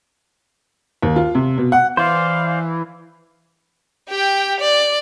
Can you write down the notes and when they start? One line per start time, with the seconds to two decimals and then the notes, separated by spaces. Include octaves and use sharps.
1.03 D#2
1.16 F4
1.35 C3
1.58 B2
1.72 F#5
1.97 E3 C5 D5 F5
4.09 G4 G5
4.60 D5